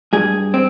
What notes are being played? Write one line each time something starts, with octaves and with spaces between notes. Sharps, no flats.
G2 G#4
C4